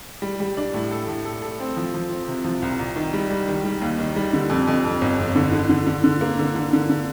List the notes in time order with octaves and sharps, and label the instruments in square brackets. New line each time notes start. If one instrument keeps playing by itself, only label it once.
[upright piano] G3
G3
D4
A2
A4
A2
A4
A4
C4
F3
F3
C4
C3
F3
C2
C2
D#3
G3
G3
D#3
G3
D#2
D#3
G3
D3
F2
F2
F2
G1
F2
D3
D3
D3
D3
D3
A#3
D3
D3
D3
D3